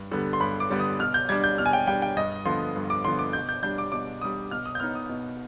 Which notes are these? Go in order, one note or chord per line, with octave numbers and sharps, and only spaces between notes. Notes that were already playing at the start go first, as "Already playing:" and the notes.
Already playing: G2
D3 G3 B3
C6
G2 B5
D6
D3 G3 B3
D#6
B2 F6
G6
G3 D4 G#6
G6
B2 F6
G#5
G5
G3 D4 G5
G5
G2 D#5
D3 F3 B3 C6
G2
D6
D3 F3 B3 C6
D6
B2 G6
G6
G3 D4 G6
D6
B2 D6
G3 D4 D#6
B2 F6
D#6
G6
B3 D#4 F6
D#6
B2